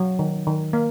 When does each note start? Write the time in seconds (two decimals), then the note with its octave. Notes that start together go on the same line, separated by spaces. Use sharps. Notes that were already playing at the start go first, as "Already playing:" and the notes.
Already playing: F#3
0.19 D#3
0.47 D#3
0.73 A#3